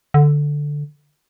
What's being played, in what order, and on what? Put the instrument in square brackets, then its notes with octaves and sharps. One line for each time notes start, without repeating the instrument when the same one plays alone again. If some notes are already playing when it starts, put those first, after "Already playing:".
[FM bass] D3